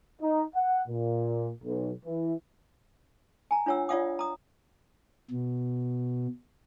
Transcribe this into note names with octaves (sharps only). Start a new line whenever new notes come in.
D#4
F#5
A#2
B1
E3
G#5 A#5
D4 F4 C#5 F#5 E6
F4 C#5 D5 F5 F#5 D#6
A#5 D#6
B2